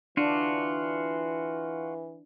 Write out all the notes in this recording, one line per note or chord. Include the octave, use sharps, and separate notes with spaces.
E3 D4 F4 F#4